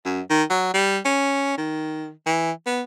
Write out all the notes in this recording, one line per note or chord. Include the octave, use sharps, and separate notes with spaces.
F#2
D#3
F#3
G3
C#4
D#3
E3
B3